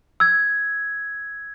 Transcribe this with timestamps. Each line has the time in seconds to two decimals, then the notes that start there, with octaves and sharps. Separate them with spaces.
0.20 E6 G#6